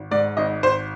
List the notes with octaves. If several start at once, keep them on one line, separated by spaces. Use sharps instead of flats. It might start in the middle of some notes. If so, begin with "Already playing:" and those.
Already playing: G#1
G#2 D5
G#1 D#5
G#1 C5